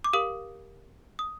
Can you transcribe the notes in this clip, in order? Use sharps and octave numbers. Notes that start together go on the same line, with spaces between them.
D6
G4 A#4 F5 D#6
D#6